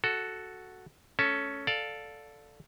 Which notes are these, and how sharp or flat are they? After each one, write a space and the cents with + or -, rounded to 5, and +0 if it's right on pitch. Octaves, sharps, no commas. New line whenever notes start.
F#4 +0 A4 -5
A3 -15 C#4 +10 A4 +0
A4 +0 D5 +0 F5 +15